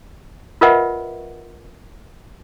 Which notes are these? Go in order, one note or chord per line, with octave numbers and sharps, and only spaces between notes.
F4 A#4 B4 D#5 E5 F#5